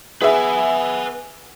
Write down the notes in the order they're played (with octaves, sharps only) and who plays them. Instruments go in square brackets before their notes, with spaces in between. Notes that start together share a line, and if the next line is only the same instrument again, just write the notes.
[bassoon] B3 [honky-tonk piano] G#4 E5 [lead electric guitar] B4 G#5